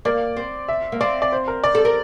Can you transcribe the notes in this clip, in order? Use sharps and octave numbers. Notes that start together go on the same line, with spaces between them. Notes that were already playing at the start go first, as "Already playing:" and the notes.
A#3 D5
C4
E5
A#3
C4 D5
D5
C5
A#4
D5
A4
A#4